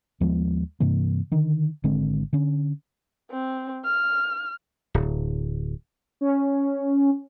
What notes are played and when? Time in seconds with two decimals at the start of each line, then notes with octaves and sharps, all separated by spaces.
0.21 D#2 F3 G#3 B3
0.80 G2 C3 E3 A#3
1.32 D3 D#3
1.84 G#1 D3 G#3 C4
2.33 D3 C#4
3.31 C4
3.85 F6
4.94 D1
6.21 C#4